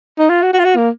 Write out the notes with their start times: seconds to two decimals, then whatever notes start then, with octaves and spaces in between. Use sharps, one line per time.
0.19 D#4
0.30 F4
0.42 F#4
0.53 F#4
0.59 F4
0.65 F#4
0.77 A#3